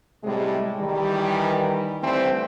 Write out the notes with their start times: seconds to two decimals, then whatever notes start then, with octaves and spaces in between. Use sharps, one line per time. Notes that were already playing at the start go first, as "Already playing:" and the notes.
0.24 A2 C3 G3 G#3
0.80 D#3 E3 G3
2.03 D3 E3 G3 A3 C4